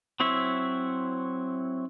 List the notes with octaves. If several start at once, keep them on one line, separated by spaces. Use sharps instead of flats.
F#3 C4 E4 C#5 E5